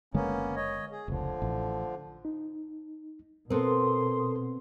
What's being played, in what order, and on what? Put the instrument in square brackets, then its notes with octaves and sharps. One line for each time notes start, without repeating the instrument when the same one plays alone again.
[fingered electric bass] F#1 D3 G#3 [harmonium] A#3 B3 C#4
[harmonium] C#5 D#5
G#4
[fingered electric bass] F1 C#2 [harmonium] D3 F3
[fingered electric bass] A1
[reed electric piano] D#4
[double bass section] B2 [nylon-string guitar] B3 C4 [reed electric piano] A4 A#4 [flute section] C6 D#6